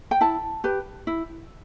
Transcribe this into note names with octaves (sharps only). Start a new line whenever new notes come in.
G5
E4 A5
G4 B4
E4